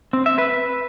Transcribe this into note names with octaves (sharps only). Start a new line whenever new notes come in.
C4
E5
B4